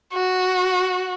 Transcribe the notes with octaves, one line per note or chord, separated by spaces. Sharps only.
F#4